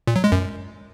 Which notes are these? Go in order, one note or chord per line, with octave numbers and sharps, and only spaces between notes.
A#2
F#3
G#3
F#2